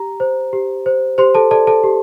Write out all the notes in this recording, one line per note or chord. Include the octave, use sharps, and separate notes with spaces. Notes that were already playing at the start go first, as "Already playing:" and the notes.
Already playing: G4 A#5
C5
G4
C5
G4 C5 C6
A4 A5
A4 D5 A5
A4 A5
G4